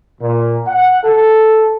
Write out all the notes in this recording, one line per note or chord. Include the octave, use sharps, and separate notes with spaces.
A#2
F#5
A4